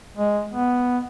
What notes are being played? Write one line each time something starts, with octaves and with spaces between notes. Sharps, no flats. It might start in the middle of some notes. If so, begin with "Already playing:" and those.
G#3
B3